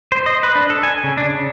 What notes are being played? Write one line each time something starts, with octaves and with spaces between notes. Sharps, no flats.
C5
D#5
B4
D4
A4
G#5
C#3
D4
C#3